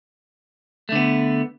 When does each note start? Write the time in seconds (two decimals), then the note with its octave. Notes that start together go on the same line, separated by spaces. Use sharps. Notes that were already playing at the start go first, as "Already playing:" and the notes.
0.89 A3
0.92 D3
0.95 B3